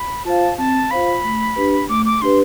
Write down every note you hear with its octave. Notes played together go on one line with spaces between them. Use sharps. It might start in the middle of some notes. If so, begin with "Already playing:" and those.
Already playing: B5
F4 C5 F5 A5
C4 A5
F4 C5 F5 B5
A3
D4 G4 B4
A3 D6
D6
D4 G4 B4 C6